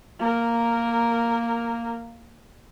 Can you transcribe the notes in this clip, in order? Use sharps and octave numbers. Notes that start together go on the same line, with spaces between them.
A#3 A#4